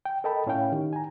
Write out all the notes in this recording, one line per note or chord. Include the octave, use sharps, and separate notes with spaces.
G5
A4 A#4 D#5 G5 A5 B5
A2 C#4 E4 C#5 F5 G5
D#3 D#4 G4
G#5 A#5